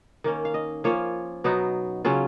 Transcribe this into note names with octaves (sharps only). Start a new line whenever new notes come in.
D#3 A#3 C#4
F5
D#5
F3 A#3 C#4 F4 C#5
B2 F#3 B3 D#4
C#3 F#3 C#4 F4